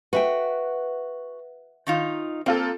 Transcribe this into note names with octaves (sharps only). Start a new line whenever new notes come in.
F#4 B4 E5 G5
D#3 D#4 F4
A#3 C4 F4 A4